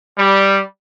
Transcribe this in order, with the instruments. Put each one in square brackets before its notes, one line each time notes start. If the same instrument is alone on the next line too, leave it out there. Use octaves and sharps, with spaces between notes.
[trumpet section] G3